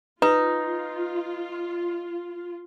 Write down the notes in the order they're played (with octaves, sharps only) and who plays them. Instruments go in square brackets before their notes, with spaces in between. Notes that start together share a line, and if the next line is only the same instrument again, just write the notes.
[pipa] D#4 [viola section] F4 [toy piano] B4